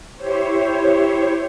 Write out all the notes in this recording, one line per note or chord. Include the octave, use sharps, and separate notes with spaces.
E4 G4 C5 C#5